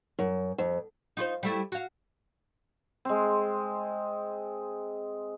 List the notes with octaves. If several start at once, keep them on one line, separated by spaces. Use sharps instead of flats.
F#2
F2
D#4 F4 C5
G3 A3 E4
F#4 F5
G#3 C4